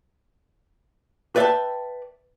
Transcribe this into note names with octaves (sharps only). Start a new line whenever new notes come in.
B4 D5 E5 F5 G5 A5